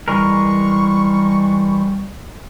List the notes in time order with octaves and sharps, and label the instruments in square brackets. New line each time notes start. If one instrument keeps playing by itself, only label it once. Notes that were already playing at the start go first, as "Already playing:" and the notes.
[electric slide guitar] E3 G#3 A#4 [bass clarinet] G3 [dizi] C#6